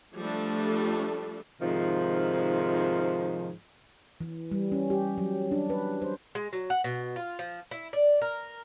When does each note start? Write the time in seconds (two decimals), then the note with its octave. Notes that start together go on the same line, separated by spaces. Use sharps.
0.17 F3 G3 A3 D4 A4
1.62 G#2 C3 D#3 F3
4.21 E3
4.52 G3
4.72 C#4
4.90 G4
5.18 F#3
5.52 D4
5.70 B4
6.02 C5
6.35 G#3
6.53 F#3
6.70 F#5
6.84 B2
7.16 F4
7.39 F3
7.71 E4
7.93 D5
8.22 A#4